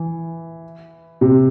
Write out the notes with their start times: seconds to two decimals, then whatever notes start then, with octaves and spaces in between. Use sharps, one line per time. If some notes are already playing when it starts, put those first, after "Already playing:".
Already playing: E3
1.21 C3